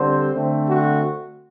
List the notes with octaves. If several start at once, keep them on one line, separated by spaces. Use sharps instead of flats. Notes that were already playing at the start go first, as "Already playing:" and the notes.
Already playing: D3 G3 C4 C5
D3 A3 C4
F#4